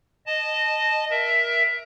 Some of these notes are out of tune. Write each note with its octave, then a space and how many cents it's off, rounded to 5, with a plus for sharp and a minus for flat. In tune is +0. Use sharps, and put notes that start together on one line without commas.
D#5 -15 A5 -10
A#4 +20 E5 +5